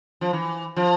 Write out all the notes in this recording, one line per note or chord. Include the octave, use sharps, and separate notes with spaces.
F3
E3
F3